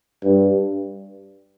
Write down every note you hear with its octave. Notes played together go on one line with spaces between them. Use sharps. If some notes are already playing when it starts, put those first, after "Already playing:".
G2